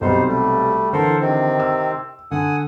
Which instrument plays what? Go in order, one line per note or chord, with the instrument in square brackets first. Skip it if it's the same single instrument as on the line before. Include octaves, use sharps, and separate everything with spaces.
[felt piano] B1 C3 [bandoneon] G3 D#4 C5
[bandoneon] G3 A3
[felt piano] D3 E3 [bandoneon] A4 A#4 C5
[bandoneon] C3 D#3 C4
[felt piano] E6
[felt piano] D3 [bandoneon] F#5 G#5 D#6